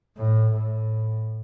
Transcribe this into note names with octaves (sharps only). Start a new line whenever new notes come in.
A2
A2